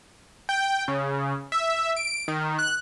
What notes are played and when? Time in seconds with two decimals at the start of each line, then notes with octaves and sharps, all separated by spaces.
0.49 G5
0.88 C#3
1.52 E5
1.96 D7
2.28 D#3
2.59 F#6